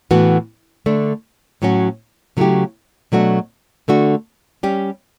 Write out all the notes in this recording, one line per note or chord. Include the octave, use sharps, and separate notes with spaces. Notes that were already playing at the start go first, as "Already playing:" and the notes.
A2 E3 B3 F#4
D3 A3 D4
A2 F#3 C#4 F#4
C#3 F#3 A3 E4 G4
B2 F#3 A3 D4 F#4
D3 A3 D4 F#4
G3 C#4 G4